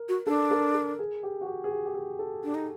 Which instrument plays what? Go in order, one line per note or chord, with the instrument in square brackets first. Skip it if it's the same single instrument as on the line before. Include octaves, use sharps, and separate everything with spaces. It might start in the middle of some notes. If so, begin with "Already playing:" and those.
Already playing: [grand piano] A#4
[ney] F#4
[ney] D4 [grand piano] A4
[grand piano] A#4
A4
G#4
G4
F#4
G4
G#4
G4
G4
G#4
A4
[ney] D4
D#4